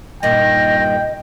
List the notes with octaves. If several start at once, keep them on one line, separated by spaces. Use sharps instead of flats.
G2 A#2 D#3 D#5 G5 A#6